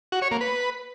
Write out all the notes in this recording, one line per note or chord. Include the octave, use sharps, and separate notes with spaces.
F#4
C#5
A#3
B4